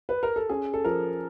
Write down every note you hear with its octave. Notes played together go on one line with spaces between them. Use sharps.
B4
A#4
A4
C#4 G#4
A4
F3 A#4